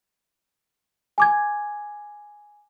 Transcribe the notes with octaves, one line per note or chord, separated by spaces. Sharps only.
G#5 D6 G#6